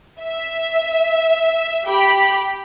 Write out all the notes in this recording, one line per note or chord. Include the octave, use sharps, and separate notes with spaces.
E5
G4 G5 B5